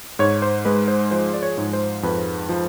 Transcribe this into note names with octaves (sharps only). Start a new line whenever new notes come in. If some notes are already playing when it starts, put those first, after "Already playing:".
G#2 C#5
C5
G#3 B4
C5
F3 C5
D5
C#5
G#2
C5
F2 B4
F3